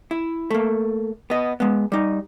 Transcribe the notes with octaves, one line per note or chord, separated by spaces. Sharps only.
E4
A3 A#3
B3 D#5
G#3 B3
G3 D#4